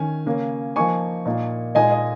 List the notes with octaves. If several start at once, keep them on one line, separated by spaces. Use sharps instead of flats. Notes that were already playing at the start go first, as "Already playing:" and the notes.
Already playing: D#3 C#4 G#5
C#3 A#3 C#4
F3 A#3 D#4 G#5 C#6
A#2 A#3 D#4
A#2 G#3 D#4 D#5 G#5
D#5